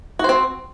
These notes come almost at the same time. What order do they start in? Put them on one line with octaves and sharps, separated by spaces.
F#4 C5 C4